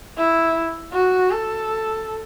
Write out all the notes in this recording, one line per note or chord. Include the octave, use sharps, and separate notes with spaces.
E4
F#4
A4